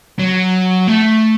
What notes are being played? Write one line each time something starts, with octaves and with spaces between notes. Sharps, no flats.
F#3
A3